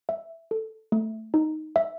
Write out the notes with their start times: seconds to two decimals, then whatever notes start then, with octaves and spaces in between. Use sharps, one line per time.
0.09 E5
0.51 A4
0.92 A3
1.34 D#4
1.76 E5